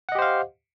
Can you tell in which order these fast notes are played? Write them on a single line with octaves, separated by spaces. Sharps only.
F#5 D#5 G4 C5 F5